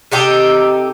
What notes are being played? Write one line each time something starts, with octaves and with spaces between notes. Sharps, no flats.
C3 D#4 G4 A4